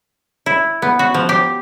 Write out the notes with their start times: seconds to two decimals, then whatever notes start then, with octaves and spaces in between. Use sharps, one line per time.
0.46 E4
0.82 B3
0.99 F#4
1.14 F3
1.29 G4